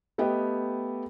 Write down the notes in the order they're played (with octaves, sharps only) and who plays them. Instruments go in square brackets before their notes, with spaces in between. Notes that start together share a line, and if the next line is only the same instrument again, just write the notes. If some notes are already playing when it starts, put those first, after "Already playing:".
[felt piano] A3 B3 G4 D#5 G5